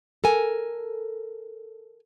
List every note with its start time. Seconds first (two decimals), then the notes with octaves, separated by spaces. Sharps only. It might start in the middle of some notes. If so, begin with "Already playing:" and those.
0.24 A4 A#4 G#5